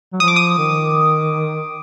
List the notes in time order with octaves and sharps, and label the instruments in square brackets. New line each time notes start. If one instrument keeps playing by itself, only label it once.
[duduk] F#3
[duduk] F3 [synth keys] D#6
[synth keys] D6
D#6
[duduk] D#3